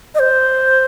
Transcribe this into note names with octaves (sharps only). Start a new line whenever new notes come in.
D#5
C5